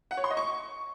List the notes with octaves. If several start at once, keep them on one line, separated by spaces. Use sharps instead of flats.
F#5
C#5
C6
D#5
C#6